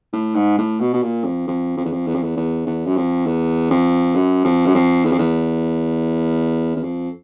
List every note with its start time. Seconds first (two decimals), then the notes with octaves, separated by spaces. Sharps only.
0.13 A2
0.35 G#2
0.58 A2
0.80 B2
0.93 B2
1.03 A#2
1.25 F2
1.47 F2
1.77 F2
1.85 E2
1.92 F2
2.07 E2
2.15 F2
2.23 E2
2.37 E2
2.67 E2
2.86 F#2
2.96 F2
3.26 E2
3.71 F2
4.15 F#2
4.45 F2
4.66 F#2
4.75 F2
5.05 E2
5.12 F2
5.19 E2
6.76 E2
6.83 F2